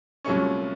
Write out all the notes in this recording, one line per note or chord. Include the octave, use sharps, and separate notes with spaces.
C2 A#2 F#3 A3 C#4 C#6